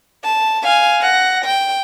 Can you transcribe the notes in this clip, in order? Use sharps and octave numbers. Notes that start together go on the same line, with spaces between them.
A5
F5 G#5
F#5 A#6
G5